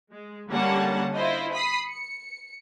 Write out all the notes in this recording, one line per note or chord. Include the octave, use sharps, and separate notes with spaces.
G#3
D3 G3 A#3 C#4 F#5 A5
E4 F4 C5 D#5
B5 D#6 B6 C7
C#7